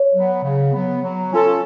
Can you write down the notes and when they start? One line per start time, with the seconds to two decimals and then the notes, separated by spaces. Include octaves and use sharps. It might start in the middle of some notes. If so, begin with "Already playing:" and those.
Already playing: C#5
0.14 F#3 B3
0.43 C#3
0.73 F#3 B3
1.01 F#3
1.31 C#4 F4 A4